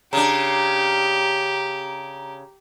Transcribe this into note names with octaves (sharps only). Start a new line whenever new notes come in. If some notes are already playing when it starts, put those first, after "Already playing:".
C#3 D4 G4 A#5